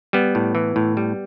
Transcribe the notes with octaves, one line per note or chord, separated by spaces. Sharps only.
G3 B3
A2
E3
A2
G3